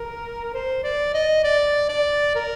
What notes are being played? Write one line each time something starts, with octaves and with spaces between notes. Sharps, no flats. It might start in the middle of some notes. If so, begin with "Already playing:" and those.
Already playing: A#4
C5
D5
D#5
D5
D5
A#4